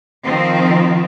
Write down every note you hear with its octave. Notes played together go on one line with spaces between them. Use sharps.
D#3 F3 C4